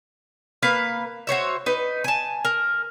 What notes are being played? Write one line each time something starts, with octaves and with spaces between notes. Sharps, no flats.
A#3 B4 F5
F#4 C5 C#5 E5
D#4 B4
G#5 A5
A#4